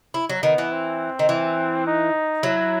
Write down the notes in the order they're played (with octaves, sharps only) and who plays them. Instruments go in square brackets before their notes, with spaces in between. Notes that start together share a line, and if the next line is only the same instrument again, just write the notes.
[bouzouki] E4
F#3
[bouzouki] D#3 [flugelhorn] B3
[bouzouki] E3
[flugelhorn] C4
[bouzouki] D#3
E3
[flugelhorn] D#4
[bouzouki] F#3 [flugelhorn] E4